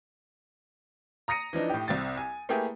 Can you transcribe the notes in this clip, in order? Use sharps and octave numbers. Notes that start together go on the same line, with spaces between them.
A#5 D#6 A#6 C#7 D#7
E3 F3 D4 D#4
A2 G4
C2 C4 A6
G#5
A3 A#3 E4 G4 G#4 B4